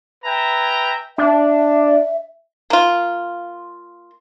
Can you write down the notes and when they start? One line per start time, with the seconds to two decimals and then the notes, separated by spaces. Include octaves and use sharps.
0.25 B4 E5 G5 G#5 A#5
1.18 D4 E5
2.70 A#3 F4